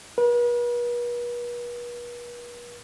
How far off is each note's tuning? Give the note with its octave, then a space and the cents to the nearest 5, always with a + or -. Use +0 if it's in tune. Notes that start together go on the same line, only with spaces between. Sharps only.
B4 -45